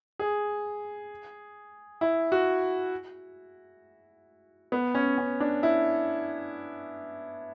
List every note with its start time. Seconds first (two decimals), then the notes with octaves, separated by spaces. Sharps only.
0.19 G#4
2.01 E4
2.32 F#4
4.72 B3
4.95 C#4
5.18 C#4
5.40 D4
5.63 E4